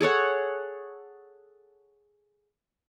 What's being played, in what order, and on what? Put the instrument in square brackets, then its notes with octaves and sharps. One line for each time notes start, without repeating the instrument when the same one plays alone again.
[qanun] G#4 A4 C#5 F#5